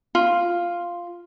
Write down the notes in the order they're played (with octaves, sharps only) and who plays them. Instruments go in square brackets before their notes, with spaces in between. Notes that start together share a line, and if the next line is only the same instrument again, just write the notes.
[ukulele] F4